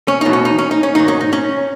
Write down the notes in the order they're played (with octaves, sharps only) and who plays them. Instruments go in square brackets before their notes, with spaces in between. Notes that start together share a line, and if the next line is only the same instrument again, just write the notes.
[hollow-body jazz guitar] C#4
E2 B2 F#3 D#4
C#4
D#4
C#4
D#4
C#4
G#2 D#3 F#3 D#4
C#4
D#4
C#4